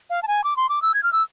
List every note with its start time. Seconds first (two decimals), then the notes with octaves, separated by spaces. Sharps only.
0.10 F5
0.23 A5
0.28 G#5
0.44 D6
0.57 C6
0.69 D6
0.82 E6
0.94 G#6
1.03 F6
1.13 E6